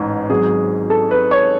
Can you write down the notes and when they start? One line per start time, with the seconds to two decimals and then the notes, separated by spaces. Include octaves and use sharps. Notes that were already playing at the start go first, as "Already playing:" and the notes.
Already playing: A1 G#2
0.30 G#1 G#2 F#3 G#4
0.90 A4
1.11 B4
1.31 C#5